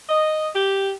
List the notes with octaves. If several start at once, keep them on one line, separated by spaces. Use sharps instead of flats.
D#5
G4